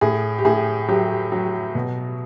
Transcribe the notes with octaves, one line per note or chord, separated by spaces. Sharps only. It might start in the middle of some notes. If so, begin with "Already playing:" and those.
A2 G#4
G4
A2 G#4
F#3 G4
F#3
B2